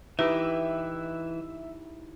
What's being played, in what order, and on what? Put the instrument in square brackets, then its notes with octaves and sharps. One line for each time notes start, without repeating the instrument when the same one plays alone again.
[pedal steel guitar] E3 E6 [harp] D#4 E4 G4 [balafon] B4 [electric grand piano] E5